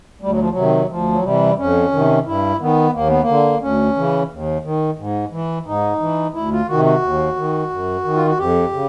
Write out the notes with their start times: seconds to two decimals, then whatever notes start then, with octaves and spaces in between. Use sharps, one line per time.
0.21 D2 G3
0.31 F#3
0.40 F3
0.50 F#3
0.56 C3 D#3
0.89 D2 F3
1.12 F#3
1.23 C3 E3 G3
1.58 F2 C#4
1.92 C3 D#3
2.26 G2 E4
2.60 D#3 B3
2.94 D#2 A#3
3.08 B3
3.22 A#3
3.28 D3
3.62 D2 C#4
3.96 C#3 E3
4.31 D#2
4.63 D#3
4.98 G#2
5.31 E3
5.66 G#2 D#4
6.00 E3
6.34 D2 E4
6.52 F4
6.68 C3 D#3 F#4
6.85 F#4
7.02 D#2
7.36 D#3
7.70 F#2
8.04 D#3
8.15 F4
8.27 F#4
8.38 F2 G4
8.72 C#3